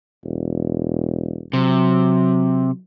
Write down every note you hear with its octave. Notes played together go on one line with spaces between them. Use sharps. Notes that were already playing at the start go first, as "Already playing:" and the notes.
E1
C3 F#3